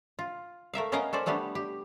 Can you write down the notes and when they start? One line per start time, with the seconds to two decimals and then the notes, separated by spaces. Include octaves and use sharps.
0.19 F4
0.74 A3 A#4 E5 F5
0.92 B3 C#4 A#4 D#5 F5 A#5
1.13 C#4 A4 C5 D5
1.26 G3 A3 B3 D4 G4
1.55 G4